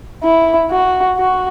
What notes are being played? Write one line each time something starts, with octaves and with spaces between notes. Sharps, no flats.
E4
F#4
F#4